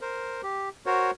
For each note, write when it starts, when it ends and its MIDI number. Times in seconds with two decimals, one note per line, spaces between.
0.01 0.41 70
0.01 0.41 72
0.43 0.69 67
0.86 1.11 66
0.86 1.11 70
0.86 1.11 72
0.86 1.11 73